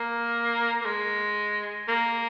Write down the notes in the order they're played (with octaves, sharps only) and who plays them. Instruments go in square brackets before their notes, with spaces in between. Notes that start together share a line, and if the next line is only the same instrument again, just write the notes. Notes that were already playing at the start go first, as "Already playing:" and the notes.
Already playing: [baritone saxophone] A#3
A#3
G#3
A#3